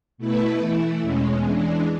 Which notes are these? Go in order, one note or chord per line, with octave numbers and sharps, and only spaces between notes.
B2 A3 E4 B4
E3 A3 E4
E2 B2 G#3 C#4
E3 G#3 D4